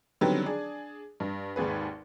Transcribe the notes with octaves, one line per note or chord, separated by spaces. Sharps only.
D3 D#3 F#3 G3 B3 C4
D4 G#4
G2
G#1 D#2 G#4 B4